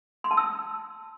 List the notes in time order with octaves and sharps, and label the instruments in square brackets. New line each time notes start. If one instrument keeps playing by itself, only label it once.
[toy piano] C6
A5
E6